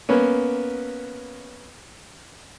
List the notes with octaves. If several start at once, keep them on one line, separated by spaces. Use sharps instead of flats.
A#3 B3 C#4